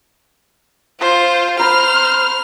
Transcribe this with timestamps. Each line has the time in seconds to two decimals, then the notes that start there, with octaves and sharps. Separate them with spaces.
1.01 F4 C5
1.60 C5 A#5 B5 F6